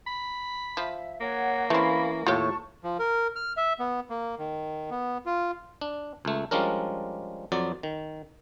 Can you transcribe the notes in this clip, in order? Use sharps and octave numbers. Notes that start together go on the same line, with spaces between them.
B5
F3 E5
A#3 C#5 F#5
E3 A3 C4 C#4 F5 B5
D#2 A2 F4 G4 C#5 A5 C#6
F3
A#4
F6
E5
B3
A#3
D#3
B3
F4
D4
C#2 A3
F3 G3 G#3 C#4 D4 A#4
F2 F#3 D5
D#3